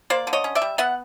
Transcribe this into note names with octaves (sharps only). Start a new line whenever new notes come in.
A#3 C5 D5
D3
C#5 D#5
C#4
D5 E5
G3
B3 E5 F#5